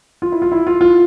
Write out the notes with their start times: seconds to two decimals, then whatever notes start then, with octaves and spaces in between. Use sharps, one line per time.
0.22 F4
0.32 E4
0.42 F4
0.52 E4
0.67 F4
0.81 F4